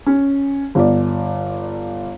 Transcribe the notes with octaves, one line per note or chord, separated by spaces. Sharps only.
C#4
G1 D5